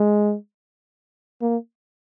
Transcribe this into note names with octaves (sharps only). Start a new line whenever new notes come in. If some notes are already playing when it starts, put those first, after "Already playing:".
Already playing: G#3
A#3